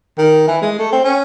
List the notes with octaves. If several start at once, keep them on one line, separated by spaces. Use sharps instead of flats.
D#3
E3
G#3
A3
C4
C#4